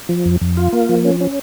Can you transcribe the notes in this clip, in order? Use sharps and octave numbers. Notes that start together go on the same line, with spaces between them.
F3
F2
F2
F4
A#3
F3
C#4
C#4